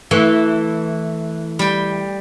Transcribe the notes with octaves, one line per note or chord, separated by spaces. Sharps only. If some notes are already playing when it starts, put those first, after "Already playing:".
E3 A3
G3 G5